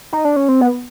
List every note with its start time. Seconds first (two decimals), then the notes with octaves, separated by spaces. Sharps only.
0.13 D#4
0.25 D4
0.36 C#4
0.49 C4
0.61 B3